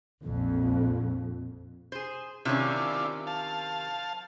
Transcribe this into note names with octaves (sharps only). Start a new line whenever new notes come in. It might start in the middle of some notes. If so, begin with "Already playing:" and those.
A#1 F2
G#4 C5
C3 D#3 C#4 D4 E4 F4
F5 A5